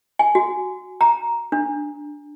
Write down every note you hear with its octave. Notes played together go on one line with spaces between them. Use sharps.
G#5
F#4
A#5
D4